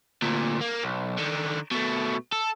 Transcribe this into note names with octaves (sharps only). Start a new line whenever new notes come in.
D2 A#2
A#3
B1
D3 D#3
B2 A3
A4